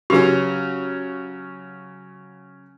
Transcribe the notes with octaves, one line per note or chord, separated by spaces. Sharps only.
C#3 F#3 C#4 G4 B4